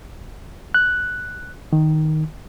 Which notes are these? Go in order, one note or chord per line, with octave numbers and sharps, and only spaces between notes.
F#6
D#3